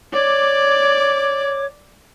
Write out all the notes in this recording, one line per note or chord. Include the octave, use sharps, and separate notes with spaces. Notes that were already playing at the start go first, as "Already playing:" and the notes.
C#5 D5 D6